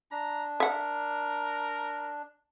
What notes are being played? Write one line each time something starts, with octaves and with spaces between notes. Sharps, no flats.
D4 A#5
A#4 E5 F#5